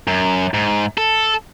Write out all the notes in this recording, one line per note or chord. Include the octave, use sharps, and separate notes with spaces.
F#2
G#2
A4